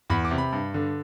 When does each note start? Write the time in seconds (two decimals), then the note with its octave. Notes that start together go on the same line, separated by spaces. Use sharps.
0.10 E2 B5
0.25 D6
0.31 C3
0.38 B5
0.52 G2
0.74 D3